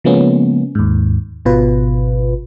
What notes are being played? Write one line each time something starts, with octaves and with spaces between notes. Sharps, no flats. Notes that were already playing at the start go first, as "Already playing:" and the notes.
C#3 F3 G#3 A#3 B3 C#4
D#2 G#2
G#1 B2 F4 B4